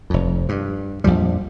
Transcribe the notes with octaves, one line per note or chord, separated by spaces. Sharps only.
F1 F2
G2
A#1 F2 F3 G3